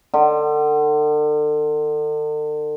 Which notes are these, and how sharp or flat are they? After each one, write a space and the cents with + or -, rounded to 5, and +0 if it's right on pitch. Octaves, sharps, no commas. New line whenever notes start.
D3 +40